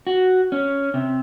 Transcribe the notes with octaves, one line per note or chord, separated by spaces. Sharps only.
F#4
C#4
C3